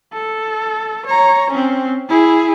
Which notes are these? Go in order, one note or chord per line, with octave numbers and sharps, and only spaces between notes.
A4
C#5 A#5
C4 C#4
E4 G#4